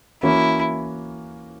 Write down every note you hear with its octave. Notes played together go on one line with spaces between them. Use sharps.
E3 A#3 C#4 E4 F#4